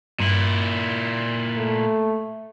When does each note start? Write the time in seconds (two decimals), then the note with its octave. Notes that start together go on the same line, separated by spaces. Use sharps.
0.20 G2 A#2 E4
1.58 A3